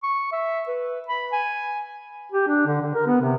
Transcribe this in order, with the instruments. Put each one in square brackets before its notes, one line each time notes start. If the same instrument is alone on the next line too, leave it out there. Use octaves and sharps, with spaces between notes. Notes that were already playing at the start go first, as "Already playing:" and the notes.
[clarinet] C#6
E5
B4
B5
G#5
[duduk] G4
D4
D3
D3
A#4
B3
C3